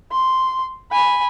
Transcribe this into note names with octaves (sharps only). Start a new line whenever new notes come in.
C6
G#5 B5